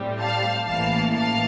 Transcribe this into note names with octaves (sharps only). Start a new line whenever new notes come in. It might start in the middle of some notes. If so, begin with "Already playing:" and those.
Already playing: A2 G3 C4
F5 A5
A1 A2 E3 A#3 F5 A5
F5 A5